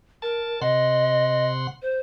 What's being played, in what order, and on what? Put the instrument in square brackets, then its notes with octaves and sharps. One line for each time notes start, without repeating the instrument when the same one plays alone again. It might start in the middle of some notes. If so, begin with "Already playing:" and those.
[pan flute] A#4 [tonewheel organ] A5
[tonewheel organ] C3 F#5 C6 [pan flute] D#5
[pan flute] C5